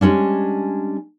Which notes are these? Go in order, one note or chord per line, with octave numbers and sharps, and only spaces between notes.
G3 G#3 A#3 C#4 D4